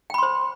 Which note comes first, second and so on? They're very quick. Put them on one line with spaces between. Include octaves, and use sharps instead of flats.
G5 B5 C6 C5